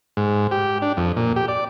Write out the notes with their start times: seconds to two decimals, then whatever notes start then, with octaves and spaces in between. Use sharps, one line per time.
0.17 G#2
0.51 G4
0.82 D4
0.97 F2
1.17 A#2
1.36 G4
1.48 D5